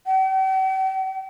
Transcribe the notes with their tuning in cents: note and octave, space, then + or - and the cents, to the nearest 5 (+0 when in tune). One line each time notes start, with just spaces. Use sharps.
G5 -45